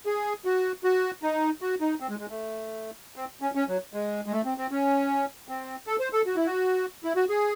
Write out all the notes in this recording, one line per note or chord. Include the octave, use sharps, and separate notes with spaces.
G#4
F#4
F#4
D#4
F#4
D#4
C4
G#3
G#3
A3
C4
C#4
C#4
F#3
G#3
G#3
A3
C4
C4
C#4
C4
A4
C5
A4
F#4
E4
F#4
E4
F#4
G#4